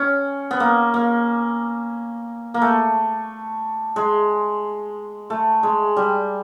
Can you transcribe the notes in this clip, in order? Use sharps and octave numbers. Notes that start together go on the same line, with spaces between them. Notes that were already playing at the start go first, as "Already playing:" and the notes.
Already playing: C#4
B3
A#3
A#3
A#3
A3
G#3
A3
G#3
G3